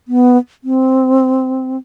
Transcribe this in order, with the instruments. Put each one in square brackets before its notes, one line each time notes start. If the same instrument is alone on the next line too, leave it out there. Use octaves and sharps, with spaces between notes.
[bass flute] B3
C4